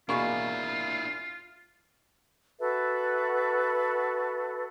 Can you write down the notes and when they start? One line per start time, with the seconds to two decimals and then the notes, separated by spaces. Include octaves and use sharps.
0.09 E2 B2 A#3 D4 E4 F4 C#6
2.59 F#4 A4 B4 E5